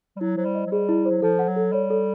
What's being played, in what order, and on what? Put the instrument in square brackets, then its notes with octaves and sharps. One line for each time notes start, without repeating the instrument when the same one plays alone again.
[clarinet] G3
[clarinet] F#3 [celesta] E4
[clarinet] F#3 [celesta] C5
[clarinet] G3
[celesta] D#5
[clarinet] F#3
[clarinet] G3 [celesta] G#4
[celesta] E4
C5
[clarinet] F#3
[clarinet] F3 [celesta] A4
[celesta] F#5
[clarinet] F#3
[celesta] A4
[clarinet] G3 [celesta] C#5
[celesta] A4